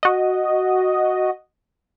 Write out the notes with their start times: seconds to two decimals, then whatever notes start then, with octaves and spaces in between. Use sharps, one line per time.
0.03 F#4 D#5